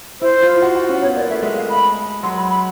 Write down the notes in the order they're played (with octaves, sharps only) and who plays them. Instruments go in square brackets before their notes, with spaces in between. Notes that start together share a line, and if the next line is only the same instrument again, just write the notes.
[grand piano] E4 [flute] C5
[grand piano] F4
F#4
F#4
C#4
[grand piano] B3 [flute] C#5
[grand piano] A#3 [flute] D5
[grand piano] A3 [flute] E5
[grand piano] G#3 [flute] E5
[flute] F5
B5
[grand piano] F#3 [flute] C6
[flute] B5
B5